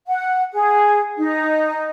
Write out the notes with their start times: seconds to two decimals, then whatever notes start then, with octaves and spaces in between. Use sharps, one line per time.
0.07 F#5
0.52 G#4
1.18 D#4